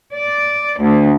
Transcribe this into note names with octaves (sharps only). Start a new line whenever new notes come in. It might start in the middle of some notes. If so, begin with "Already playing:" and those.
D5
D2